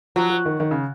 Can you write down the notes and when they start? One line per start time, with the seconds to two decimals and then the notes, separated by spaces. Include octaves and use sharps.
0.16 F3 F#3
0.30 F3
0.46 D#3
0.60 D#3
0.71 C#3